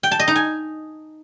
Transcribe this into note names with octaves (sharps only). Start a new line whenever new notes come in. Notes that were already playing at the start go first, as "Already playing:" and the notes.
G5
A5
D#5
D#4
G#5